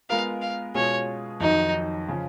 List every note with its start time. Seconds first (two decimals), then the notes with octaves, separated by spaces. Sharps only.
0.10 G#3 B3 F4 A#4 F5
0.42 F5
0.75 B2 G#3 C#4 F4 G#4 C#5
1.40 F2 D#3 F#3 D#4
2.09 C#3 F3